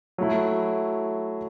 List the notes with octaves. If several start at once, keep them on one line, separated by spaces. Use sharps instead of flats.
F#3 A3 E4